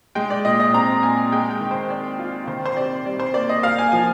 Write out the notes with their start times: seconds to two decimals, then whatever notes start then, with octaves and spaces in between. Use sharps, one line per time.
0.15 G#3 G5
0.30 D5
0.45 A#2 D#5
0.60 D#5
0.73 C4 A#5
1.02 A#2 G#5
1.32 G#3 G5
1.50 G5
1.61 D#3
1.71 C5
1.90 C4 D5
2.19 F4
2.47 D#3 C5
2.65 C5
2.77 C3 D5
3.05 G3 D5
3.20 C5
3.34 A#3 D5
3.49 D#5
3.63 A#3 F5
3.78 G#5
3.92 F3 G#5